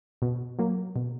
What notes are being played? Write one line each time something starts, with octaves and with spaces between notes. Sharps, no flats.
B2
F#3 A#3
B2